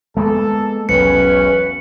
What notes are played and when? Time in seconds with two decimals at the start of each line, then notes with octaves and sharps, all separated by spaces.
0.17 G#3 A#3 B3 A4
0.89 E1 B1 C#4 B4 C#7